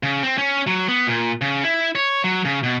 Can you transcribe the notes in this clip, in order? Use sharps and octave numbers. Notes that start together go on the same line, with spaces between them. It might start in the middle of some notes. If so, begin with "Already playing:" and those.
C#3
C4
C#4
F#3
B3
A#2
C#3
E4
C#5
F#3
C#3
B2